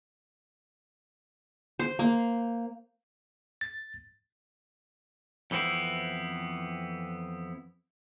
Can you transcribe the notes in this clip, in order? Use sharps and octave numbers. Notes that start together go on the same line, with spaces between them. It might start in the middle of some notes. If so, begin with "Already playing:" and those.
C5
A#3
A6
F2 E3 B3 C4 E4